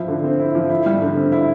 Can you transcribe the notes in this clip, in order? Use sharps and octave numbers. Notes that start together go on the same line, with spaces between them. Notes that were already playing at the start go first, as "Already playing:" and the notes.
Already playing: F3 E4
D3
C4
E4
F3
E4
G3
D3
C4
E4